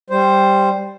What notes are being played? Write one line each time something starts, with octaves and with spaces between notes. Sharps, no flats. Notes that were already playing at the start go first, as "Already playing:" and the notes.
G3 C5